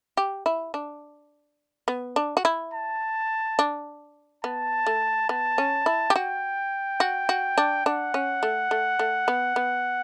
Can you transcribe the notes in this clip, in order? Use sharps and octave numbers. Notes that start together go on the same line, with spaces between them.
G4
E4
D4
B3
D4
F#4
E4
A5
D4
B3 A5
A3
B3 A5
C#4
E4
G4
F#4 G5
F#4
F#4
D4
D4 F#5
C#4
A3
A3
A3
B3
B3